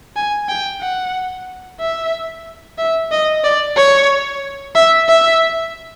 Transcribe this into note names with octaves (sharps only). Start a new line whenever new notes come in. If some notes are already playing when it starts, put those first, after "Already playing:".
G#5
G5
F#5
E5
E5
D#5
D5
C#5
E5
E5